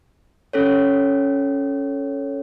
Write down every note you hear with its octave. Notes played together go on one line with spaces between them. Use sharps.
C#4 A4 C#5